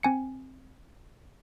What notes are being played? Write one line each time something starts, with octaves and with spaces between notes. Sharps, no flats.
C4 G#5 C#7